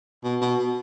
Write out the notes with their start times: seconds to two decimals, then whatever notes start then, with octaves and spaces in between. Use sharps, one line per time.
0.24 B2
0.41 B2
0.58 B2